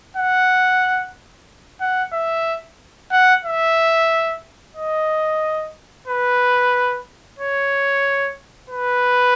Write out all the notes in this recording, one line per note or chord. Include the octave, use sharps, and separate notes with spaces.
F#5
F#5
E5
F#5
E5
D#5
B4
C#5
B4